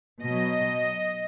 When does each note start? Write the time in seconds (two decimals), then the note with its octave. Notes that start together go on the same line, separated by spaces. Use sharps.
0.23 B2 F#3 D#5